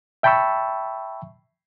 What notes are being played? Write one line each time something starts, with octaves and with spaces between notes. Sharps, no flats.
E5 G5 A5 B5 C#6 E6